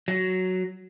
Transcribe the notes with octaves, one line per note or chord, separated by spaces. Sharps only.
F#3